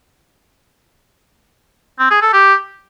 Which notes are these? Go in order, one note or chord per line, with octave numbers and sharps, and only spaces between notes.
C4
G#4
A4
G4